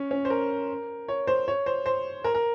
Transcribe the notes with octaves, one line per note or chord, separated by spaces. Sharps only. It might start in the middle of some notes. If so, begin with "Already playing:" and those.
Already playing: C#4
C#4
C5
A#4
C#5
C5
C#5
C5
C5
A#4
A#4